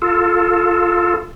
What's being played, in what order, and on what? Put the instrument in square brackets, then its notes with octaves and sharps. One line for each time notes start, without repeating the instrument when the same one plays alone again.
[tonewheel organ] F4 A4